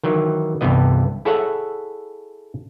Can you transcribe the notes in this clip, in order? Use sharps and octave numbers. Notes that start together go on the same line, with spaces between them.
D#3 E3 F#3
C2 G2 C3 E3 B3 D#5
E4 G#4 A4 C#5 E5 F#5